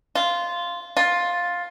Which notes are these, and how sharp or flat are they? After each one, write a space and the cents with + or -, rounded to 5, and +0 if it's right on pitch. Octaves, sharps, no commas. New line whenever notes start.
F4 -10
F4 +10